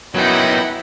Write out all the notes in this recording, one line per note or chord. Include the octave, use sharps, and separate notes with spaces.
F#2 F#3 B3 D#4 E4 F#5 G5